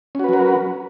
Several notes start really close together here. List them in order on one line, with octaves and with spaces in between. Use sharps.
C#4 F#4 B4 F#3 A#4